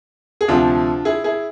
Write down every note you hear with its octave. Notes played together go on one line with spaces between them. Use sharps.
G#4
D2 C3 F3 D4 F4
E4 G#4
E4 G#4